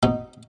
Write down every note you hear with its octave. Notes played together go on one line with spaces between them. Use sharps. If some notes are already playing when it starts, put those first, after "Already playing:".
B2 D#4